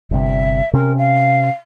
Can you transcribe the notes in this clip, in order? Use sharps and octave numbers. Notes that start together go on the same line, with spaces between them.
G1 G2 C3 E5
C3 C#4 A#4
F5